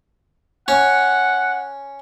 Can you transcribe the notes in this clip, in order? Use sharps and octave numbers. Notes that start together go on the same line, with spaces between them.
C#4 C#5 F#5